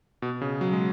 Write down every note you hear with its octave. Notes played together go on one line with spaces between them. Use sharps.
B2
C#3
F#3
G#3